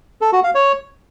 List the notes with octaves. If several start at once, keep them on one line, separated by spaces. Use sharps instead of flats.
A4
F#4
F5
C#5